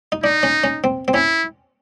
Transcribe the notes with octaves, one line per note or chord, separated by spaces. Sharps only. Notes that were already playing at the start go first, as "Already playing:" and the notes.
D#4
D4 D#4
C#4
C#4
C4
C4
C#4 E4